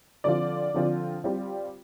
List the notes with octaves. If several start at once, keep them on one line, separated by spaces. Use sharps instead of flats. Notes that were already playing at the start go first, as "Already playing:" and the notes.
D3 F3 C4 F4 D5
D3 F3 C4 F4
G3 C4 F4